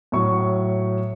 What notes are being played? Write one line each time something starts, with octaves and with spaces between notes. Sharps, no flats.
A2 F#3 C#6